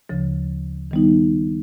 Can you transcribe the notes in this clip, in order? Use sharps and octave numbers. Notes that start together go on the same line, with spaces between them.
D2 C#3 F3
D#3 G3 B3 D#4